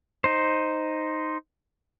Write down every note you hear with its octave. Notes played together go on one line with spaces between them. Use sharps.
D#4 C5